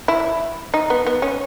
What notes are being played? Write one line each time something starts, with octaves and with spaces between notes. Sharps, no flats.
E4
D#4
B3
B3
C#4